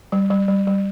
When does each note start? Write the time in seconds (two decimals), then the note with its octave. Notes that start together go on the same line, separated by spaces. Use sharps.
0.12 G3
0.30 G3
0.48 G3
0.67 G3